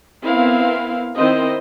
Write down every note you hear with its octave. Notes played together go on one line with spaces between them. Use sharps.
B3 C4 E4 A#4 F5
D#3 C4 E4 C5 D#5